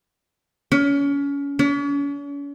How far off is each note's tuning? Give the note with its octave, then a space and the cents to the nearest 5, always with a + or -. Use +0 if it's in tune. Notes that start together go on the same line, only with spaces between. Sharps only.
C#4 +30
C#4 +45